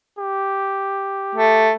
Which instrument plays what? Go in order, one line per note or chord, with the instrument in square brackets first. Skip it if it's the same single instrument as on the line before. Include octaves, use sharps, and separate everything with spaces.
[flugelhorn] G4
[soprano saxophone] A3